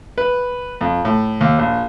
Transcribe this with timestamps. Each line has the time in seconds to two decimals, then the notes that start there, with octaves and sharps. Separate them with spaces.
0.18 B4
0.81 F2
1.05 A2
1.41 D#2
1.59 A#1